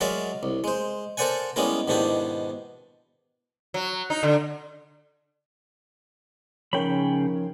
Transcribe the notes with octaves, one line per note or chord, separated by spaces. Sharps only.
F#3 G#3 A#4 D5 E5 F5
C2
G#3 C5
A4 A#4 C5 D5 F#5 G#5
G3 G#3 B3 C#4 E4 A#4
G#2 B2 D#3 D4 E4 G4
F#3
D#4
D3
C#3 F3 C#4 D#4 A#4 C#5 G5 B5